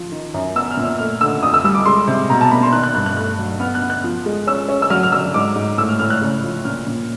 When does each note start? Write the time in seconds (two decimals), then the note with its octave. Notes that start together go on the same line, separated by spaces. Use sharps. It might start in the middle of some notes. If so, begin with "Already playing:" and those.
Already playing: F3
0.12 D#3
0.34 F#2
0.55 B3 E6
0.71 F6
0.77 A#2
0.85 E6
0.99 A3 F6
1.21 D3 E6
1.43 F2 D#6
1.54 E6
1.64 G3 E6
1.75 D6
1.86 G#3 C6
2.08 C3
2.30 B2 A#5
2.41 A5
2.51 A#3 B5
2.63 C6
2.73 D#3 F#6
2.83 F#6
2.95 G2 F#6
3.06 F#6
3.17 A3 F#6
3.39 F#3
3.60 B3 F6
3.75 F#6
3.82 B3
3.90 F#6
4.04 F3
4.26 G#3
4.47 C#4 E6
4.69 C#4
4.82 E6
4.90 F#3 F6
5.03 F6
5.12 F#3 E6
5.34 G#2 D6
5.56 G#2
5.78 A2 E6
5.89 F6
5.99 A2 F6
6.10 F#6
6.22 C#3
6.44 F3
6.65 A#2 F6
6.87 A#2